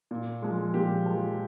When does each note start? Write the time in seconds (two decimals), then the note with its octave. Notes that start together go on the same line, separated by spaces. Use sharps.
0.11 A#2
0.42 F3 G#3
0.74 A#2 G4
1.06 F3 G#3